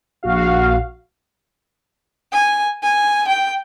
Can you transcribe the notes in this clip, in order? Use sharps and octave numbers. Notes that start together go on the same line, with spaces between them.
A#1 F#4 F5
G#5
G#5
G5